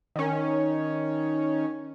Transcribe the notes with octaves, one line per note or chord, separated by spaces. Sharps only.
D#3 C#4